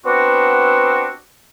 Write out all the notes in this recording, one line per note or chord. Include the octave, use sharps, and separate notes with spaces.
B3 C4 D4 F#4